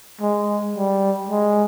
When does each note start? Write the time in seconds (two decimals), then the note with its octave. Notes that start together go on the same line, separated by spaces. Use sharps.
0.21 G#3
0.75 G3
1.29 G#3